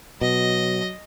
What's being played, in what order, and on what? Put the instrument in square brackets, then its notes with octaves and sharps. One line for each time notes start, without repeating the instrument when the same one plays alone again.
[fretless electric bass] B2 [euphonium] F#3 [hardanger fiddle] D#5